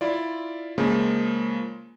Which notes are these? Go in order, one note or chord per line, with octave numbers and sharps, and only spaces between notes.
E4 F4 D5
C#3 F3 G#3 A#3